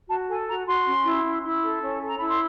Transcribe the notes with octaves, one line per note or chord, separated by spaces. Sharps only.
F#4 A5
A4 G#5
F#4 A#5
F#4 C6
C#4
E4
C#4
E4
A4
C#4
A4
A#5
E4 B5
C6